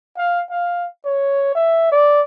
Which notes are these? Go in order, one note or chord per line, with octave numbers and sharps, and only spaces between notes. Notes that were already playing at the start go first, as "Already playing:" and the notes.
F5
F5
C#5
E5
D5